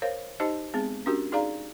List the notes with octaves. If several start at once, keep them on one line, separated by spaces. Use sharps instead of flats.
A#4 C5 C#5 F5
D#4 G4 C5 D#5 A5
G#3 B3 C4 G#4
C#4 D4 F#4 G4 A#4
D#4 G#4 D5 F5 A#5